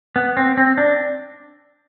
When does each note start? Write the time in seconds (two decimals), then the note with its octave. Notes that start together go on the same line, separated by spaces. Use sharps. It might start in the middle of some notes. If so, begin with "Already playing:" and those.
0.16 B3
0.37 C4
0.57 C4
0.78 D4